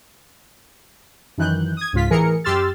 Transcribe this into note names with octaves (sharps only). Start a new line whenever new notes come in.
F#2 D#3 E3 F#6 G6
D#6 G#6
C#2 G#2 F4 B6
A2 E3 G#4 A#4 C#7
F#2 G4 C6 E6 F6 A6